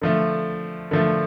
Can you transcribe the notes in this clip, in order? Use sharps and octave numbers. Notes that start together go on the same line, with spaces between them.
D3 F3 A3
D3 F3 A3